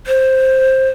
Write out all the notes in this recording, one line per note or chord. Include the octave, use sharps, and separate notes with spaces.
C5